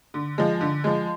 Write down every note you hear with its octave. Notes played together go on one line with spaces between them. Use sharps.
D3
F3 G#3
D3
F3 G#3